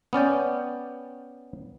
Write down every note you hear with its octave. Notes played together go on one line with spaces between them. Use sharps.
B3 C#4 D5 G5